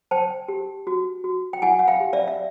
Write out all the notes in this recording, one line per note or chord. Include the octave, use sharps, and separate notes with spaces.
C5 G5 A5
G4
F#4
F#4
G5
E4 F#5 G#5
F#5
F5 G5
G4
D5 E5
E5